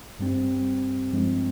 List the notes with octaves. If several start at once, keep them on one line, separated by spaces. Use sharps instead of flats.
G2 G3 C4 G4
G2 F3 G#3 C4